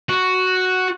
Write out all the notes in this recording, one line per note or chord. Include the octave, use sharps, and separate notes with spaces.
F#4